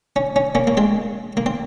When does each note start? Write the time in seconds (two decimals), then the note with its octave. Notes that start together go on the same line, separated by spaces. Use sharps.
0.16 C#4
0.36 C#4
0.55 A#3 C#4
0.67 A#3
0.77 G#3 C4
1.37 A#3
1.46 C4